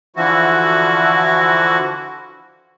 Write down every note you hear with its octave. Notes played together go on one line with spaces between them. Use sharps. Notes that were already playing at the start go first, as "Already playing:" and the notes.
D3 E3 F3 E4 F#4